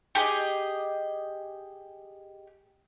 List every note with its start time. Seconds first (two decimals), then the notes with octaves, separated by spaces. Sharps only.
0.15 G4 G#4 D#5